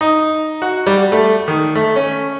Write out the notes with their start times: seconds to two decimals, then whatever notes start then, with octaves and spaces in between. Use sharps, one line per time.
0.01 D#4
0.62 F#4
0.87 G3
1.12 A3
1.48 D#3
1.76 A3
1.96 C#4